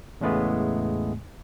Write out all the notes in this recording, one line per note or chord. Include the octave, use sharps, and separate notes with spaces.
E2 A2 C#3 G#3 A3 B3